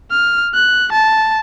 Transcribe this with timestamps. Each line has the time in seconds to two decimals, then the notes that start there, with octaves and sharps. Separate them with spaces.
0.11 F6
0.54 F#6
0.92 A5